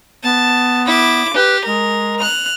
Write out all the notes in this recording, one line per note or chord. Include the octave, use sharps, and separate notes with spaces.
B3 A5
E4 D6
G4 B4
G#3 A#4
F6 F#6